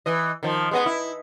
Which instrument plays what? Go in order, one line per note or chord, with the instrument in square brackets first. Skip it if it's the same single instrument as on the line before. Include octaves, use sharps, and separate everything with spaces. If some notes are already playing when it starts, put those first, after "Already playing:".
[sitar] E3 D#5
D#3 F3
G#3 B3 D#5
E4